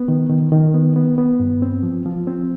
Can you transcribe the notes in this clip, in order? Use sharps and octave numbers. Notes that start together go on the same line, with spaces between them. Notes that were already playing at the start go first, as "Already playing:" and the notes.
Already playing: B3
D#3
D#3
D#3
B3
B3
B3
G2
C4
F3
F3
C4